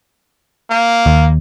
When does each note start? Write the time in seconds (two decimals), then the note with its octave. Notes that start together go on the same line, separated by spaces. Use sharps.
0.70 A#3
1.06 D#2